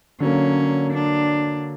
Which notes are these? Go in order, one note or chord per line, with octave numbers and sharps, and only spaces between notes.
D3 F#3 A#3 C#4
D4